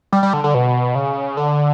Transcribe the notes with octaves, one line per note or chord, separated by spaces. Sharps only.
G3
G3
D3
D3
B2
C#3
D3